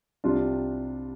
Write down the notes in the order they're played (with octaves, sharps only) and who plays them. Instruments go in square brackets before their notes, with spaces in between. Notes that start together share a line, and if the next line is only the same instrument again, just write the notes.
[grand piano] C2 C3 G3 D4 F4